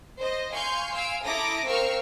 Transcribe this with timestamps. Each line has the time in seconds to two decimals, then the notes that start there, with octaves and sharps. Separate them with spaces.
0.18 C5 D#5
0.54 F5 G#5 C6 C#6 G6
0.94 F5 G#5 E6 D7
1.24 E4 A4 A#5 D6 D#6 A#6
1.66 C4 A#4 F5 C#6 E6 F6